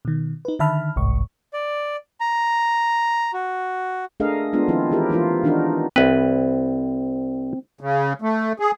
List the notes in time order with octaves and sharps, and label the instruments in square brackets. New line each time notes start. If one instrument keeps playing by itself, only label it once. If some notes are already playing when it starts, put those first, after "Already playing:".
[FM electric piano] B2 D#3
D#4 B4
D3 D#3 E5 A5 B5 F6
G1 C2 G#2 C#6
[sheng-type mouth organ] D5
A#5
F#4
[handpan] A3 D4 G#4 A#4 D#5 F5
G#3 B3 D4 F4
D#3 F3 C4 E4 F4
E3 E4 G4 A#4
E3 F3 A#3 E4 F4
D#3 E3 D4 D#4 F#4 A#4
[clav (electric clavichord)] C2 B4 [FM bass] C4
[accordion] C#3
A3
G#4